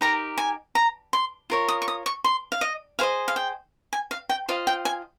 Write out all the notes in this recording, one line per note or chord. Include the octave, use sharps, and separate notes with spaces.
D#4 G4 A#4 A#5
G#5
A#5
C6
F4 A#4 C#5
D#6
C#6
D#6
C#6
C6
F5
D#5
G#4 C5 D#5 F5
F5
G5
G#5
F5
G5
F4 C5 D#5 F5
G5
G#5